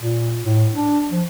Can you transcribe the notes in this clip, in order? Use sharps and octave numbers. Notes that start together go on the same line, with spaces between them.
A#2
A2
D4
F3